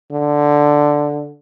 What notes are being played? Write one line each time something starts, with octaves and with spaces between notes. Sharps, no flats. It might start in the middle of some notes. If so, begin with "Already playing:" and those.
D3